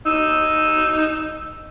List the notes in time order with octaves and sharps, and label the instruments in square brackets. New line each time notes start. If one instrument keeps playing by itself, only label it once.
[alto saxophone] D#4 [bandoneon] E6